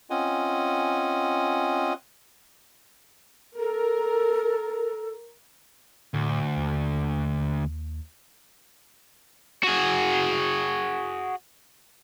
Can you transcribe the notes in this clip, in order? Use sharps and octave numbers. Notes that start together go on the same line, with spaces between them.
C4 C#4 F4 D#5 F#5 G#5
A4 A#4
D2 A2
D#2
F#4 G#4